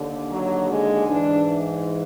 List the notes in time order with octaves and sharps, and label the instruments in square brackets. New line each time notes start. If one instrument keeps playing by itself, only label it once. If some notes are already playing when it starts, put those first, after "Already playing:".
Already playing: [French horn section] D#2 D3
F#3
G#3
G#2 E3 D4